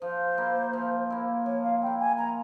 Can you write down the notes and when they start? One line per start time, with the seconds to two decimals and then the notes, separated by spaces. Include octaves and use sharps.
0.02 F3 C5
0.37 A#3 E4
0.73 F3
1.10 A#3 E4
1.46 F3 C#5
1.63 F5
1.82 A#3 E4 G5
2.00 G#5
2.18 F3 A#5